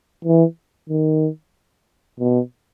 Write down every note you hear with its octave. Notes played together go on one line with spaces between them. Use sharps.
E3
D#3
B2